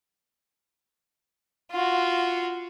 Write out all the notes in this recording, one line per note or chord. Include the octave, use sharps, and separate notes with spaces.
F4 F#4